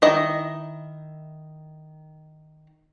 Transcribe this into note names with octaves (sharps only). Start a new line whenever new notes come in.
D#3 E4 D#5